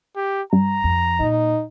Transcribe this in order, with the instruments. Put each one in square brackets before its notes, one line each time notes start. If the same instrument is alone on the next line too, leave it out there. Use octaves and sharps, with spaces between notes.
[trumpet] G4
[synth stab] G2 [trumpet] A#5
[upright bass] F2
[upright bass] A#2 [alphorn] D#4